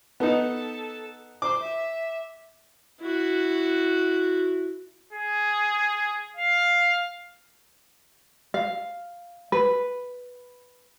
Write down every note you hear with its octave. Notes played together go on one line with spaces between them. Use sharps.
B3 D#4 A4
C5 D6
E5
E4 F#4
G#4
F5
F5
B4